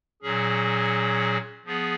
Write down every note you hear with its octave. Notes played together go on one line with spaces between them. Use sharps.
A#2 F#3 C#4 G#4
F3 B3 G#4